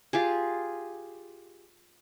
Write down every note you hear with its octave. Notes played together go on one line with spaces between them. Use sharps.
F4 G4 G#4